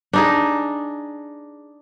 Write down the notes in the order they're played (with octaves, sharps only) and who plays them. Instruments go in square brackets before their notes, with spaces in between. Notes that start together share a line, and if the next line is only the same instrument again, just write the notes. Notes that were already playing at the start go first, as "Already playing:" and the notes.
[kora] D4 D#4 G#4